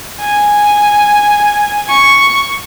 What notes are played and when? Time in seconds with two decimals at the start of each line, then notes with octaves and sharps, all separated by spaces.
0.21 G#5
1.89 C#6